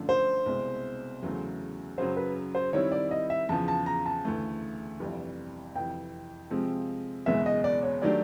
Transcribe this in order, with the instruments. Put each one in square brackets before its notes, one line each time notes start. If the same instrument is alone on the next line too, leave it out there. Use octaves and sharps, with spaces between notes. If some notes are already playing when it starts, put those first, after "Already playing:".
Already playing: [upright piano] G1 F#2 D3 F3 A3
[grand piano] C5
[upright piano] C2 B2 G#3
E2 C#3 F#3 A3
[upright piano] F#2 C#3 F#3 [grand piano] C5
[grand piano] B4
C5
[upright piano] D#3 G3 C4 E4 [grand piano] C#5
[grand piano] D5
D#5
E5
[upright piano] E2 C#3 F3 [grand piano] A5
[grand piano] A5
A#5
A5
[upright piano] D2 C#3 E3 A3
G1 F2 C3 E3 G3
[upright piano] F2 C3 E3 [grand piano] G5
[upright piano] C3 F3 G#3 C4 F4
[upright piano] F#1 E2 B2 G#3 [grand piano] E5
[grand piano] D#5
D5
C#5
[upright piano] D#3 F#3 A3 D4 G4 [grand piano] D5